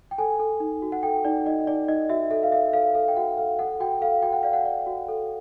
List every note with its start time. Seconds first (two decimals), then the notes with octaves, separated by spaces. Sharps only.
0.11 G5
0.18 A4 G#5
0.40 A4
0.60 D#4
0.82 F#4
0.92 F#5
1.03 A4 G5
1.25 D#4 D5
1.46 D#4 D#5
1.67 D#4 D5
1.88 D#4 D#5
2.09 F#4 E5
2.31 A4 E5
2.43 F5
2.52 A4 E5
2.73 A4 F5
2.95 A4 F5
3.08 G5
3.16 F#4 F#5
3.38 A4 F5
3.59 A4 F#5
3.80 F#4 G5
4.01 A4 F5
4.22 F#4 G5
4.32 F#5
4.43 D5 F5
4.53 F#5
4.65 D5
4.87 F#4
5.08 A4